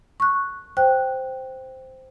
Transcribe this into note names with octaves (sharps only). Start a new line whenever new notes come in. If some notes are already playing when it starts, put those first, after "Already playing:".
C#6 F#6
C5 G5 F#6